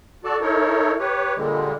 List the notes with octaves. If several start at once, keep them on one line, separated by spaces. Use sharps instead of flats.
F#4 A4 D5 A5
D#4 E4 A4 A#4 C#5
G4 B4 C#5
A#2 D3 G3 G#3